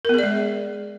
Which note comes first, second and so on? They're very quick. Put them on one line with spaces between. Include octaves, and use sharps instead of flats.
A#4 B3 G#4 D5 G#3